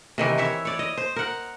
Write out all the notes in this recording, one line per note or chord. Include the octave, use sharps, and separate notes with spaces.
C3 D#3 E3
E4 C#5 E5
C#5 D5
D#5
C5
A#4 F#5